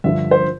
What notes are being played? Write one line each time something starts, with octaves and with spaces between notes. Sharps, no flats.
G2 D3 F3 E5
C5